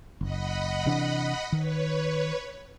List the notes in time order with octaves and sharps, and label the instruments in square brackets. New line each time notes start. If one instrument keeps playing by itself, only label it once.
[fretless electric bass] F#1 [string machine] D#5 F#5 B5
[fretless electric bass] C3 E3 D4
[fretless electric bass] D#3 [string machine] B4 C#5